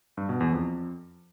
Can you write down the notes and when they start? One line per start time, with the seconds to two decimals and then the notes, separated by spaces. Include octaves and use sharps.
0.17 G2
0.29 B2
0.41 E2
0.52 F2